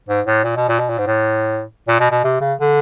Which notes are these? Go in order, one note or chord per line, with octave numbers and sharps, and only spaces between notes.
G#2
A2
A#2
B2
A#2
B2
A#2
G#2
A2
A#2
B2
B2
C3
C#3
D3